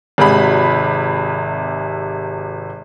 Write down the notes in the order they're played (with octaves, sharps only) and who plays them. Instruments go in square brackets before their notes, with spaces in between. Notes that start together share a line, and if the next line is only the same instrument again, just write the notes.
[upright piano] G#1 C3 G#4 B5